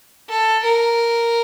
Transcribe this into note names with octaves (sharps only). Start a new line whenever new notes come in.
A4
A#4